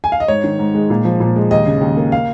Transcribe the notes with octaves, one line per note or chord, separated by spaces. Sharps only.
G#5
F5
D#5
G#2 C#5
D#3
G#2
G#3
A#2
F3
A#2
G#3
D#2 D#5
C#3
D#2
A#3
F5